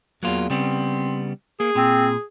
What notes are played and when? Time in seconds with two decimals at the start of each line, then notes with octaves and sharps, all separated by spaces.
0.23 E2 F#3 A#3 F4
0.50 C#3 G3 B3 C4
1.60 A#3 G#4
1.75 A#2 C4